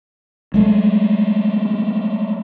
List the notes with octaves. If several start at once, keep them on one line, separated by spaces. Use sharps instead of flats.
F#3 G#3 A3